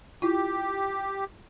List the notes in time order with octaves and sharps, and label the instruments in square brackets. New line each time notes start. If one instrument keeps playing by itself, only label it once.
[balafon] E4 F4 [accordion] G4